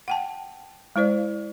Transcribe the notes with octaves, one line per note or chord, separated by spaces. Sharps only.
F#5 G5 A5
G#3 E4 C5 D5